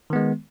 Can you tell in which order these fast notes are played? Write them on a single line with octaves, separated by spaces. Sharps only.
D#3 B3 G#3